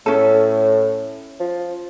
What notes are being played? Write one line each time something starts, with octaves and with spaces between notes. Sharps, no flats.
A2 C#4 A4
F3